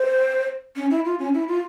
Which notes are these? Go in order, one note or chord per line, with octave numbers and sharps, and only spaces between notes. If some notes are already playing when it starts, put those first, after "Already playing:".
Already playing: C5
C#4
E4
F4
C#4
E4
F4